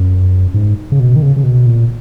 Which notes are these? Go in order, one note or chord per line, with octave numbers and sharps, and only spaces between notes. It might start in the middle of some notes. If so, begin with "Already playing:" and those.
Already playing: F#2
G#2
C#3
B2
D#3
C#3
C#3
B2
A#2